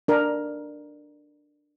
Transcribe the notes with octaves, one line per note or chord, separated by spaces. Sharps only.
D4 A#4